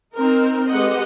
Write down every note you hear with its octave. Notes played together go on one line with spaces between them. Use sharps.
C4 D#4 A#4
G#3 G4 A4 B4 D#5 F#5